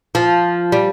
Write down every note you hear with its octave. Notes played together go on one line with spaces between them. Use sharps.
F3
G3